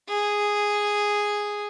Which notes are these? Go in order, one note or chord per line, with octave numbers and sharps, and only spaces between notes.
G#4